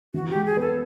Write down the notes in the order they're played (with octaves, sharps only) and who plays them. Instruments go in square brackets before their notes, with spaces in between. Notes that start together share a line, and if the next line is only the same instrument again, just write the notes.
[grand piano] E3 [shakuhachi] F#4
[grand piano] G#3 [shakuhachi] G4
[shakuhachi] G#4
[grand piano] B3 [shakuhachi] A4